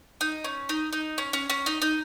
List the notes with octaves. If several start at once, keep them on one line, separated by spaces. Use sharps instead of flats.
D#4
C#4
D#4
D#4
C#4
C#4
C#4
D#4
D#4